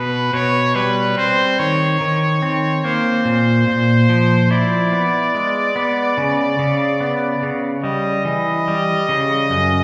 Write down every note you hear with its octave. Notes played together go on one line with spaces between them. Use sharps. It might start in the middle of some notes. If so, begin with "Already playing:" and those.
Already playing: B2 B3 B4
B2 C#5
G3 B4
C4 C5
D#3 C#5
D#3
C4
A#3 C5
A#2
A#2
F3
E4 D5
B3
G#3
B3
C#3
C#3
B3
C#3
G3 D#5
E3 D#5
G3
C#3
F#2